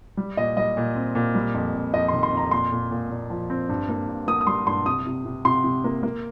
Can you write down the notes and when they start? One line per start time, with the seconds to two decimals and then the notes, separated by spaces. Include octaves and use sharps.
0.17 G3
0.37 A#2 D#5
0.57 G3 D#5
0.77 A#2
0.95 C4
1.15 A#2
1.35 G3
1.54 F2
1.74 F2
1.93 F2 D#5
2.08 D#3 C6
2.23 C6
2.32 F2 A#5
2.51 A#2 C6
2.72 A#2
2.91 A#2
3.10 A#2
3.30 F3
3.50 C4
3.69 G2
3.89 A#3
4.08 G2
4.28 A#3 D#6
4.41 D#6
4.47 G3 C6
4.67 G2 C6
4.86 C3 D#6
5.06 C3
5.25 C3
5.45 C3 C6
5.64 C3
5.84 A#3
6.03 A#3